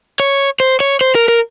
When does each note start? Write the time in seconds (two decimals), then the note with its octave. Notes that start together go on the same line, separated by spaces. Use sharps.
0.20 C#5
0.60 C5
0.80 C#5
1.01 C5
1.15 A#4
1.28 A#4